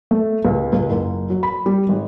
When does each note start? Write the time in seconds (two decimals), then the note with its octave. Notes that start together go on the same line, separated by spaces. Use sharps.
0.11 A3
0.45 C#2
0.73 C#2
0.90 F#1
1.30 F#3
1.43 B5
1.66 G3
1.89 G#1